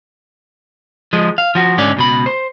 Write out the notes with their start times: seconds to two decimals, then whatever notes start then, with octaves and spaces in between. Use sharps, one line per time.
1.13 F3 G#3
1.38 F5
1.55 F3 F#4
1.78 G#2 D3 C#4 D5
1.97 C#2 B2 B5
2.26 C5